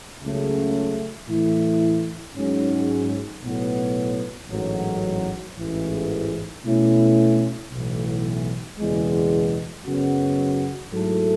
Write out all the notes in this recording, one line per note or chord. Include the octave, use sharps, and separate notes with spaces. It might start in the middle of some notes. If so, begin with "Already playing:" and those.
C#2 C#3 F#3 A3
A2 E3 A3 E4
G#2 F#3 C#4
B1 A2 F#3 B3
A1 G#2 F#3
A1 G#2 E3
B2 A3 C#4 E4
B1 A2 E3
F#1 E2 B2 G#3
F#2 C#3 F#3 B3 F#4
G#2 F#3 A3 E4 A4